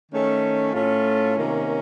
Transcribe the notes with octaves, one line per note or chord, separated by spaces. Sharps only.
D#3 A3 C#4
A2 A3 C#4 F4
C3 D#3 A#3 C#4